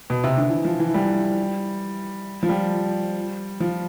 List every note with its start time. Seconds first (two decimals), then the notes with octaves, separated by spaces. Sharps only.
0.10 B2
0.24 C3
0.37 D3
0.49 E3
0.65 F3
0.80 E3
0.94 G3
2.43 F3
2.49 G3
3.60 F3